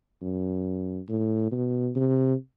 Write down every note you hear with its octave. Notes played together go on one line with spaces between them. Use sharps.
F#2
A2
B2
C3